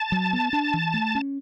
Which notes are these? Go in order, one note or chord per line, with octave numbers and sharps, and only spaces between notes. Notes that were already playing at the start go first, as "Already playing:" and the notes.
Already playing: A5
F#3
B3
D4
E3
A3
C#4